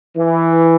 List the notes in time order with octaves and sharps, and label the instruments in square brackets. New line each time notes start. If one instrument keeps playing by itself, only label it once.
[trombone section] E3